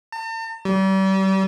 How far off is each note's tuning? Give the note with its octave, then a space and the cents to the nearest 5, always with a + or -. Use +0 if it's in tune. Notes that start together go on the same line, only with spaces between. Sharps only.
A5 +45
G3 -35